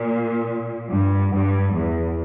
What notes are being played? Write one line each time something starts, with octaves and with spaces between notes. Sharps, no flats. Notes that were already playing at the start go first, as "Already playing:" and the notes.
Already playing: A#2
G2
G2
E2